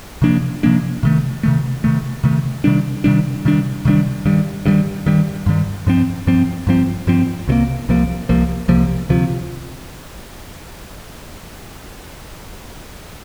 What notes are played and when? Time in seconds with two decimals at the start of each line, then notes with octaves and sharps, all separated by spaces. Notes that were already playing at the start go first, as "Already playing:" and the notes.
0.22 C3 F3 A#3 D4
0.63 C3 F3 A#3 D4
1.03 C3 D#3 A3
1.43 C3 D#3 A3
1.84 C3 D#3 A3
2.24 C3 D#3 A3
2.64 C3 D#3 G3 D4
3.04 C3 D#3 G3 D4
3.45 C3 D#3 G3 D4
3.85 C3 D#3 G3 D4
4.26 G2 D#3 G3
4.66 G2 D#3 G3
5.06 G2 D#3 G3
5.46 G2 D#3 G3
5.87 G2 F3 C4
6.27 G2 F3 C4
6.67 G2 F3 C4
7.07 G2 F3 C4
7.47 C2 C3 F3 A#3
7.89 C2 C3 F3 A#3
8.29 C2 C3 F3 A#3
8.68 C2 C3 F3 A#3
9.09 D2 C3 F3